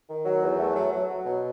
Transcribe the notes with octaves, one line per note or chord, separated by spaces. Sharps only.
D#3
F#3
E2
A3
F#3
F#3
F#3
B2